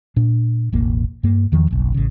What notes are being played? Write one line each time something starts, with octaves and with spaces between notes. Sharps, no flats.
A#2 D4
E1 A1 A#3
G2 A#3
E2 D#3 F3
F#1 B1
A1 C#3